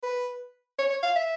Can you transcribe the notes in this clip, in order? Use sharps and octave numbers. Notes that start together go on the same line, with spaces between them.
B4
C#5
C#5
F5
E5